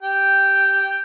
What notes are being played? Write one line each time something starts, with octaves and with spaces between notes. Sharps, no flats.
G4 G5